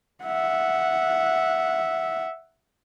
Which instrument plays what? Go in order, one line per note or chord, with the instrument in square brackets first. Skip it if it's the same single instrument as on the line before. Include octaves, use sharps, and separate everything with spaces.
[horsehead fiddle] E5 F#5